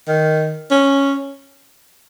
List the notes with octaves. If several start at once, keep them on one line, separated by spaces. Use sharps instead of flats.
D#3
C#4